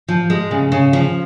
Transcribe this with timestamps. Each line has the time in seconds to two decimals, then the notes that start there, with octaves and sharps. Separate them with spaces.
0.08 F3
0.30 G#3
0.51 C#3
0.72 C#3
0.93 F3